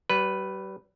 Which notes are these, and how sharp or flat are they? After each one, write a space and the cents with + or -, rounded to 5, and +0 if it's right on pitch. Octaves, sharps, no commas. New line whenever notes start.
G3 -40 B4 +0